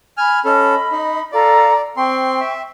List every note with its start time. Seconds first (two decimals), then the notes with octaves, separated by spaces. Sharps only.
0.17 G#5 B5 F6
0.45 C#4 A4 D#5 B5
0.92 D#4
1.32 F4 A4 D5 A#5
1.97 C4 G5 C6 C#6
2.40 E5